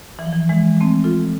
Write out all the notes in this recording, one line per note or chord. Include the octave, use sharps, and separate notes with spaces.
E3
F3
E3
E3 G#3
A3 C4
F4 A4